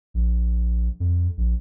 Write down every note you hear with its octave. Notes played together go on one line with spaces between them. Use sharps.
A#1
F2
A#1